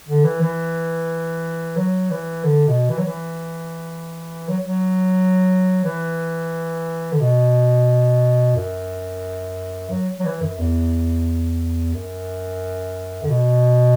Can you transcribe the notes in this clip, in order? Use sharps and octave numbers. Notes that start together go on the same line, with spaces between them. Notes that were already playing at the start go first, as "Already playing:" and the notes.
D3
E3
E3
F#3
E3
D3
B2
E3
F#3
E3
F#3
F#3
E3
D3
B2
F#2
F#3
F#3
E3
F#2
E2
F#2
D3
B2